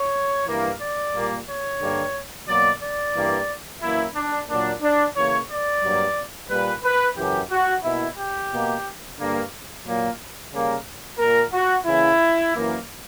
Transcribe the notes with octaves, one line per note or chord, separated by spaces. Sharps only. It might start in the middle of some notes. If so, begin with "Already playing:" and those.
Already playing: C#5
G2 E3 A#3
D5
A#2 G3 A#3
C#5
G2 D3 G3 A#3
B2 F#3 A#3 D5
D5
G2 E3 A#3
F#2 E3 A#3 E4
D4
A#2 F#3 A#3 D4
D4
C#3 E3 A#3 C#5
D5
G2 F#3 A#3
A#2 G3 A#3 B4
B4
F#2 C#3 E3 G4
F#4
B2 A#3 E4
G4
B2 A#3
G2 D3 A#3
A#2 F#3 A#3
C#3 G3 A#3
A#2 A#3 A#4
F#4
C#3 E3 A#3 E4
F#2 E3 A#3